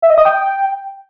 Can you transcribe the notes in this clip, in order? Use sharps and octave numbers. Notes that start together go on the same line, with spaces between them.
E5
D#5
D#6
G5